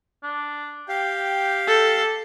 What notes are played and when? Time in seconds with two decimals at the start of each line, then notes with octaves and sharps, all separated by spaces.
0.23 D4
0.89 G4 F5 G5
1.68 A4